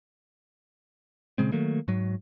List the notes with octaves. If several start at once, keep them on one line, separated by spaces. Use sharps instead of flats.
A#2 C#3 G#3 C4
D#3 F#3 A3 A#3
G#2 F#3